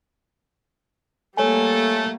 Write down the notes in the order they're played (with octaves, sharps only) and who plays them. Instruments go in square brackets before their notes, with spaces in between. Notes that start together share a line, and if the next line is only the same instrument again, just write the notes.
[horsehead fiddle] G3 A#3 [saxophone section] A3 [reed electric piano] C#5 G#5